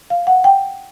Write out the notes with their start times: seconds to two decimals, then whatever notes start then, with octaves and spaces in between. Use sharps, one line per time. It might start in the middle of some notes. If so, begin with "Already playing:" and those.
0.10 F5
0.27 F#5
0.44 G5